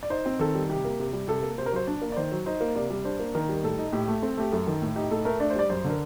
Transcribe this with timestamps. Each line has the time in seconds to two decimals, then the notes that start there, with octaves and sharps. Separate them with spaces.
0.03 D5
0.10 D#4 C5
0.26 C4
0.39 D#3 A4
0.55 G3
0.69 C3 G4
0.85 A#3
0.99 C3
1.13 G3
1.28 C3 A4
1.43 A#3
1.58 C3 C5
1.66 A#4
1.72 F#3 C5
1.87 D4 D5
2.02 A#3
2.12 D5
2.16 D#3 C5
2.32 F#3
2.46 D#4 C5
2.61 A#3
2.75 C3 D5
2.90 G3
3.05 D4 C5
3.20 A#3
3.35 D#3 A#4
3.49 G3
3.63 A2 A4
3.78 D#4
3.92 A2 G4
4.08 A3
4.22 C4 A4
4.37 A3 G4
4.52 F#2 A4
4.67 D#3
4.82 A2
4.96 D#4 G4
5.10 A2 A4
5.25 A3 A#4
5.40 D4 D5
5.50 C5
5.55 G3 D5
5.70 F#2 C5
5.84 D3
5.90 A#4